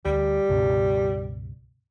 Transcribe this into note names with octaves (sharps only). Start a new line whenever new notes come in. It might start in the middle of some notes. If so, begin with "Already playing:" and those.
D2 G3
C#2 G2 B2